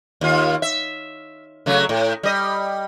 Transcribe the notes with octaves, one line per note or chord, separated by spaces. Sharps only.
D#2 F4
E5
C#3 F#3 A3
A2
G3 D#5